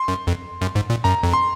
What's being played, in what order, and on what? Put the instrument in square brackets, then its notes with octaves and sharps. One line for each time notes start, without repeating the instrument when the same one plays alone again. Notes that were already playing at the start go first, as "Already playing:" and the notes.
Already playing: [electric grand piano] C6
[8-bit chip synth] F#2
F2
F#2
G#2
A#2
[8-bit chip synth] F#2 [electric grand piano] A#5
[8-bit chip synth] F2
[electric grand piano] C6